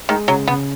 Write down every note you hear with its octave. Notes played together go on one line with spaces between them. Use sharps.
D#3 G#3
C#3 F#3
C#3 B3